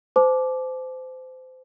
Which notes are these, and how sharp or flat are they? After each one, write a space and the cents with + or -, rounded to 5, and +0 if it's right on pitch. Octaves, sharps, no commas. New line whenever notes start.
C5 -30 A5 -35 D6 +0